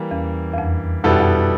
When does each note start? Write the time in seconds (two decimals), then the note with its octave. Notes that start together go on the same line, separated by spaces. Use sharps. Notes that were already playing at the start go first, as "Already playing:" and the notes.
Already playing: E3 G3 A#3
0.11 E2
0.53 E2
0.58 F2
1.04 F2 B2 G3 B3 E4 A4
1.12 F#2
1.20 F2